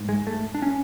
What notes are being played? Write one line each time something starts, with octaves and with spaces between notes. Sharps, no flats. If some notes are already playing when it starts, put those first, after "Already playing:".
Already playing: G#2
G#3
A3
D4
C#4